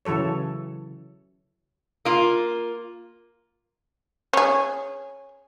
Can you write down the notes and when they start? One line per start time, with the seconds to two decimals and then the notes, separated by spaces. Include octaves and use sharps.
0.05 C#3 E3 F#3 A4 C#5
2.05 A#3 F4
4.33 C#4 G#4